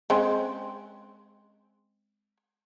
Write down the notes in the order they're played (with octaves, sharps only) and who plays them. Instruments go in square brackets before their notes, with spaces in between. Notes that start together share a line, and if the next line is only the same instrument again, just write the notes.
[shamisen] G#3 C4 C#4